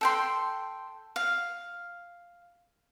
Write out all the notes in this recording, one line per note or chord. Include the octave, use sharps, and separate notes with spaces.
A4 G5 C6
F5